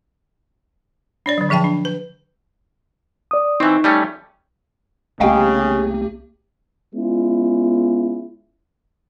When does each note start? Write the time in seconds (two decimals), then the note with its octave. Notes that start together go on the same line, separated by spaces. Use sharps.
1.26 D4 C#5 D5
1.38 D3 F#3
1.49 D3 F3 G#4 E5 G5 A5
1.64 D4
1.85 B4
3.31 D5 D#6
3.60 E3 C4 D#4 C#6
3.84 G3 A3 C#4
5.20 C2 C#3 A3 A#3 G4 D#5 F5 G5
6.95 G#3 B3 C#4 E4 F4